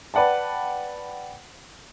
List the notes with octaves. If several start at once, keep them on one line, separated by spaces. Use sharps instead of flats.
B4 D5 F#5 G5 A5